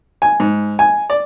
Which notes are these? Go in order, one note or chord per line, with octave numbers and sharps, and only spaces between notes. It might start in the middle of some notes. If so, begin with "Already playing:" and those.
G#5
G#2
G#5
D5